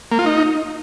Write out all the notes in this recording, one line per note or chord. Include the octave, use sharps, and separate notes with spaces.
A#3
F4
D#4